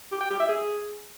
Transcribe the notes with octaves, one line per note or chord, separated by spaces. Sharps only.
G4
G5
G4
E5
G#4